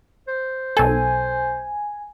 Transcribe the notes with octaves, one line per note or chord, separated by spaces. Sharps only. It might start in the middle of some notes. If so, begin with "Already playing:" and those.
C5
B1 A4 G#5